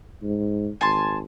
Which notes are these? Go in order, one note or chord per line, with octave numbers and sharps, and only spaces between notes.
G#2
G#1 G#5 A5 C6